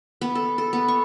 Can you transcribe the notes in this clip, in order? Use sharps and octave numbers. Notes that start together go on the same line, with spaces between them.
B3
A4
A4
B3
C#6